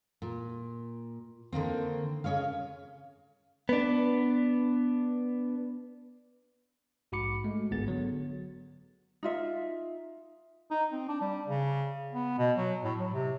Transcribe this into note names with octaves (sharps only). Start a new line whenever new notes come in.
A#2
D3 D#3 A#3 C4
C#3 C#5 D#5 F5
B3 D4
A#1 G#2 F#4 B5 D6 C#7
G#3 A3
G1 C2 G#2 B3 G#4 A6
D3 F#3 B3
D#4 F4 E5
D#4
C4
D4
G3
C#3
B3
B2
F#3
A2
F#3
C3